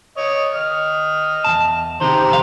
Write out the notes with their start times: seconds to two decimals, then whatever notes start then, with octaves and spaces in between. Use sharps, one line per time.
0.17 C#5 D#5
0.55 D#5 F6
1.44 E2 G#2 A5
2.01 C3 D#3 G4 C5 A#5
2.29 C2 F2 F5